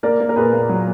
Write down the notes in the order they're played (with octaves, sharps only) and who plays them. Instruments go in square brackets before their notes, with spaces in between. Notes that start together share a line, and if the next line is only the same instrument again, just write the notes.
[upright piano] A#3 A#4 D5
A#3
A#4
A#2 G#4 B4
A#3
F#3